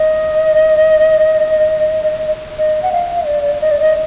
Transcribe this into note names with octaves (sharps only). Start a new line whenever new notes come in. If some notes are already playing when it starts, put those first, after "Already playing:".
Already playing: D#5
D#5
F#5
F5
D5
D#5
D5
D#5